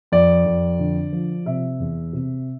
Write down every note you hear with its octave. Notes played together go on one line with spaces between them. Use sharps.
F2 D5
F2
D3
F3
C3 E5
E2
C3